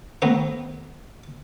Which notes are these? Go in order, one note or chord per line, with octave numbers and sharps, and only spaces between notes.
D#3 A3 B3 C4 D#4